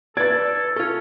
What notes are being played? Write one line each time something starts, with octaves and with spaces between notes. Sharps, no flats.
A4 B4 D5 G#6 A6
C#4 F4 A4